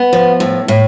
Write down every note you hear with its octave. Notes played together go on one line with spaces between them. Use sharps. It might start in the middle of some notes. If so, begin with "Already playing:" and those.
Already playing: B3
F3
A2
A2